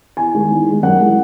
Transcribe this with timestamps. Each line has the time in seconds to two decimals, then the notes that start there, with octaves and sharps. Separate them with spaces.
0.17 E2 G#5
0.34 D#3 G#3
0.50 E2
0.67 D#3 G#3
0.83 F#2 F#5
1.00 E3 G#3